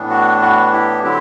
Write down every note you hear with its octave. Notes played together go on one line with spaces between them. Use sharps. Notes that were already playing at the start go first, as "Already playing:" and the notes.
Already playing: A2 E3 B3 D4
F#4
F#4
E4 G4
D3 F#3 C4 E4 G4